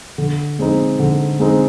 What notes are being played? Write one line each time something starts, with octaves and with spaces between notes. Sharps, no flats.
D3
G#3 C4 D#4
D3
G#3 C4 D#4